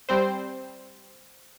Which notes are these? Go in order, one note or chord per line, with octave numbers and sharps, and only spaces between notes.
G3 C4 C5